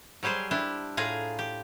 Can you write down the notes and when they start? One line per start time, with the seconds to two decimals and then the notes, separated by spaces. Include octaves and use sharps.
0.23 F#3 G3 G4 G#4 C5
0.51 D4 E4 G4
0.97 A2 F4 G#4 F5 A#5
1.39 G4